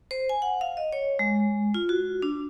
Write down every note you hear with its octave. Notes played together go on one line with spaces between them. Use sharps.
C5
G#5
F#5
F5
D#5
C#5
G#3
F4
F#4
D4